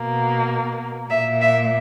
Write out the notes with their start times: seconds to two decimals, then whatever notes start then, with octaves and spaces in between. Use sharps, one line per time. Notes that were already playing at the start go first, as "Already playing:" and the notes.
Already playing: B2 A#3
1.10 A#2 A#3 E5
1.41 E5